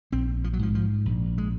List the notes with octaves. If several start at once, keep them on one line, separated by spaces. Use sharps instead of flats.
A#1 C4
F3
F#3
G#2 F3
F3
A#1
G#3